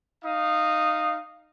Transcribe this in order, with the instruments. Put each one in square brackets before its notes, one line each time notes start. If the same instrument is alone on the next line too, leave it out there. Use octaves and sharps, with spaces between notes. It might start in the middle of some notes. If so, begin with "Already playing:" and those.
[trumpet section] D#4 F5 D#6